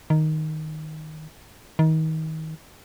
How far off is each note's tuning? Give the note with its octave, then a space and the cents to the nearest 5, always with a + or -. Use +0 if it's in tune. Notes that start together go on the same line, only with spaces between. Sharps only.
D#3 +0
D#3 +30